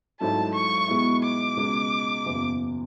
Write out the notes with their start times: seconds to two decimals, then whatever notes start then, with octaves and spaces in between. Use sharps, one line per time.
0.20 G#1 G#2 F#3 A3 E4 A5
0.55 C#6
0.88 B2 G#3 B3 E4
1.23 D6
1.57 C#2 B2 G#3
2.25 F#1 E2 B2